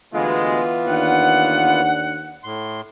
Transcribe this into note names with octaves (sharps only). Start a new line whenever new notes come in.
D2 B2 E3 G#3 B3 F4
D#2 D4 F#5
A2 C6